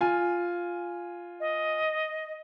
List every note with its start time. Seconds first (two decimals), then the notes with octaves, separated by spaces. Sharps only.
0.01 F4 G#5
1.40 D#5